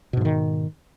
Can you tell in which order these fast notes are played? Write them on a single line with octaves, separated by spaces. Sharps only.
B2 G#2 F3 D#3